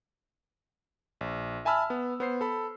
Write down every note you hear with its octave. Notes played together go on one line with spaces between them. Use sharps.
A#1
E5 G#5 A5 B5 E6 F6
B3
B3 C5 C7
A4 B5